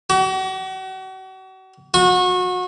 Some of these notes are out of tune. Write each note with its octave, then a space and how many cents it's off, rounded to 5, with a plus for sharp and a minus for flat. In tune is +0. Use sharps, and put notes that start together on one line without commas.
F#4 +40
F#4 -30